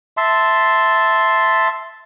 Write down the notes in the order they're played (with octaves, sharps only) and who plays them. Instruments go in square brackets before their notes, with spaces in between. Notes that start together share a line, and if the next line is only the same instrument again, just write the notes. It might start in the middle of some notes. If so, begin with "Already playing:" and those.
[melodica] E5 A5 C6